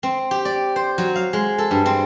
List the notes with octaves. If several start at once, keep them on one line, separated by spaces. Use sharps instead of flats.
C4
G4
D5
C5
F#3
F5
G#3
A4
G2
C4